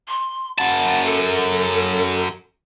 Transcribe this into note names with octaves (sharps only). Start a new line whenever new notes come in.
C6
F#2 F#5 A5
A4